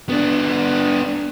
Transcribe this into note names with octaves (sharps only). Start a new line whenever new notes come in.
B3 D4